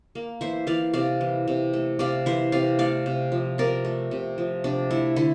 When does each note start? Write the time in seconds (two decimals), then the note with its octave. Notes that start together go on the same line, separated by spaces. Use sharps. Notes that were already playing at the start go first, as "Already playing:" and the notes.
0.15 A#3
0.41 E3 C5 E5
0.67 E3 D5 F5
0.93 C3 D5 F5
1.21 E3
1.47 C3
1.73 A3
1.99 C3 D5 F5
2.26 E3 C5 E5
2.52 C3 D5 F5
2.79 A3 D5 F5
3.06 C3
3.32 F3
3.58 C3 A#4 D5
3.85 A3
4.11 C3
4.38 F3
4.64 C3 D4
4.91 A3 E4
5.16 D3 E4